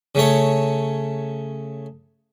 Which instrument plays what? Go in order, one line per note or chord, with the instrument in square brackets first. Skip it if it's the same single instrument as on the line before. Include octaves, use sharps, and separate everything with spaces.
[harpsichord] C#3 A3 C#5